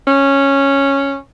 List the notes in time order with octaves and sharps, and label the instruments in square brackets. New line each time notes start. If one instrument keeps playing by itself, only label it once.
[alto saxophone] C#4